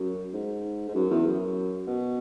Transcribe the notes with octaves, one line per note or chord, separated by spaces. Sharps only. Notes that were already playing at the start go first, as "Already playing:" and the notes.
Already playing: F#2
G#2
G#2
F#2
E2
F#2
B2